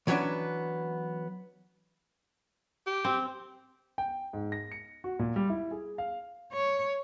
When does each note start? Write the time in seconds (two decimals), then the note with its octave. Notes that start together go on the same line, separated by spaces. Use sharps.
0.07 E3 F#3 G3 B3 C#4 D4
2.86 G4
3.05 C4
3.98 G5
4.33 G#2
4.52 A#6
4.72 C#7
5.04 F#4
5.19 A#2
5.36 G3
5.50 E4
5.71 G#4
5.98 F5
6.53 C#5